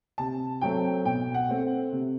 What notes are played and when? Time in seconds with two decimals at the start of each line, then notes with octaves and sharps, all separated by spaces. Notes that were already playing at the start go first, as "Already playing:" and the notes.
0.18 C3 A5
0.61 F#3 A3 C4 G5
1.05 B2 G5
1.34 F#5
1.49 A3 C4
1.92 C3